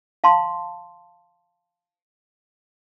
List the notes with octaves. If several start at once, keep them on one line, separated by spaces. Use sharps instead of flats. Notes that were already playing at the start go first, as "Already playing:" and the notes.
F5 A5 C6